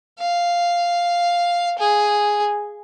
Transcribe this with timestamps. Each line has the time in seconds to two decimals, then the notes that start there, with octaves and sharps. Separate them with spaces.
0.19 F5
1.78 G#4